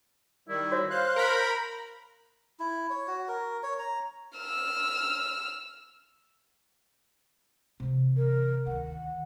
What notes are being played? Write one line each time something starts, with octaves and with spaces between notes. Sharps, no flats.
D#3 G3 E4
F#4 C#5 E5
C5 F5 F#6
A#4 A#5 B5
E4
C#5
F#4
A#4
C#5
A#5
E6 F6
C3 E3
A#4
D2 D#3 F#5